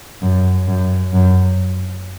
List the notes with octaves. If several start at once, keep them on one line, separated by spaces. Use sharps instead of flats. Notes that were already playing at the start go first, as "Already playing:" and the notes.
F#2
F#2
F#2